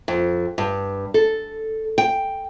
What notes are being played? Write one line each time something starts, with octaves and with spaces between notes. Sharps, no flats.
F2
G2
A4
G5